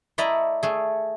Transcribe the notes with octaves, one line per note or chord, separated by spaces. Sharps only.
A3 E4 D5 D#5 A#5
A3 G#4